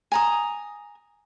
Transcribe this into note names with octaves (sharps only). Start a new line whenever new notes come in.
G#5 A#5 D#6